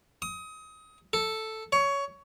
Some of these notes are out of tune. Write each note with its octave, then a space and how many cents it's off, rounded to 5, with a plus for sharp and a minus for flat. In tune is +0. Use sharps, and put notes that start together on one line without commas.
D#6 +25
A4 +0
C#5 +15